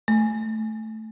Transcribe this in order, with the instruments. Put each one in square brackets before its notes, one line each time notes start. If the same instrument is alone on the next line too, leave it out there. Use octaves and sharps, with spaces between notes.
[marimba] A3